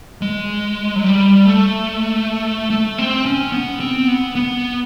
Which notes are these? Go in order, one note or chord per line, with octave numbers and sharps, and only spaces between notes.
G#3
F#3
G3
A3
A3
C4
C#4
B3
C4
B3
B3